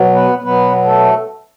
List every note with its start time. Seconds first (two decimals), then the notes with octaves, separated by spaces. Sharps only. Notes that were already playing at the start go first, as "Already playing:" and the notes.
Already playing: B2 F#3
0.15 B3 B4
0.43 B2 F#3 B3 B4
0.84 A3 A4